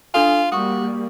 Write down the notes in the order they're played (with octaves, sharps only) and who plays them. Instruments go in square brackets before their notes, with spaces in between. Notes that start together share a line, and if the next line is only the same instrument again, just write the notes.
[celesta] D4 A4 G#5 [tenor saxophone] F4
[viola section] G3 A#3 [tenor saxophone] F#4 [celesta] C#6 D#6